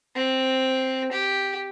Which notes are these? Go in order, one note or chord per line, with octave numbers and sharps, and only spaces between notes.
C4
G4